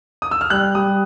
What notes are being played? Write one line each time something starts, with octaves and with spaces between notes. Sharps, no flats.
D#6
E6
F6
G3 F#6
G3 D#6